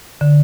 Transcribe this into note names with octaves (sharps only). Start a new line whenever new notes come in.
D3